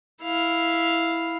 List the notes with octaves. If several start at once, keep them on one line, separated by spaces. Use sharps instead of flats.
E4 F5